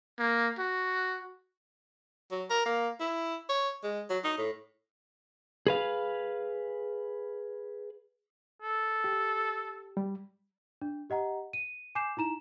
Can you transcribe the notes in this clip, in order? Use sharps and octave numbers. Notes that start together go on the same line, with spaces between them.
A#3
F#4
F#3
A#4
A#3
E4
C#5
G#3
F#3
D#4
A2
G#4 B4 F5
A4
G4
G3
D4
G4 D#5 F#5 A#5
D#7
G#5 D6 G6 C7 E7
D#4 E4 A#5 E7